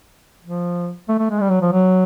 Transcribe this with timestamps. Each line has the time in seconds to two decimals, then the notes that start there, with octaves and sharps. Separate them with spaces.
0.44 F3
1.08 A3
1.19 A3
1.30 G#3
1.40 G3
1.51 F#3
1.61 F3
1.72 F#3